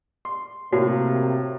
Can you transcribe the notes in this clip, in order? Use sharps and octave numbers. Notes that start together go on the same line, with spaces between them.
C6
A2 C3 A#3 F#4